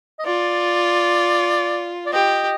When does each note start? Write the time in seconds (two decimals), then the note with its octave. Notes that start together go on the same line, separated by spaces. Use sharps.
0.19 D#5
0.26 F4 D5
2.06 D5
2.13 G4 D#5